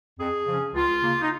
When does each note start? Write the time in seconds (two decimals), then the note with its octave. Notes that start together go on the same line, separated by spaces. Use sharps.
0.19 F2 G#4
0.47 C#3 F3 C#4
0.74 C#2 F4
1.01 C#3 A#3
1.21 D#4